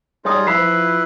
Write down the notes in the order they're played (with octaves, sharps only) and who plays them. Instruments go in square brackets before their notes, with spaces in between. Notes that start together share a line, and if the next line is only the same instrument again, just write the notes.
[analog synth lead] G3 [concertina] D#4 F4 G#4 [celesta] C#5 D#6
[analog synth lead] F3 [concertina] E4 B4 [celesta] B5 B6 C7